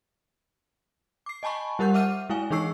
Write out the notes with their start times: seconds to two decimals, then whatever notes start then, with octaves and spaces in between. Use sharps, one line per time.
1.26 D6 C7
1.43 D#5 G#5 A5 B5 C#6
1.79 G3 G4 A#4 F#5 C#6 G6
1.94 E5 F#5 D6 F6 D#7
2.29 G#3 E4 F5 G#5
2.50 E3 D#4 G#4 C#6 E6 C7